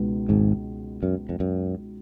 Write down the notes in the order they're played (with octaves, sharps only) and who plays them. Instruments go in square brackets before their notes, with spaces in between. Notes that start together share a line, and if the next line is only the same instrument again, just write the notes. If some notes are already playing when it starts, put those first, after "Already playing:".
Already playing: [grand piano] C#2 B2 G#3 B3 D#4
[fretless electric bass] G#1 G#2
F#2
F2
F#2